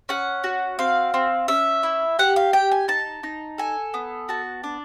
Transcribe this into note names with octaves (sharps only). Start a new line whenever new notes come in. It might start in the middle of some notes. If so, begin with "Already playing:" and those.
C#4 F#5
F#4
C4 F5
C4
C#4 E5
E4
G4 F#5
F5
G4 G5
G#5
D#4 A5
D#4
A4 G#5
B3
F#4 A5
D4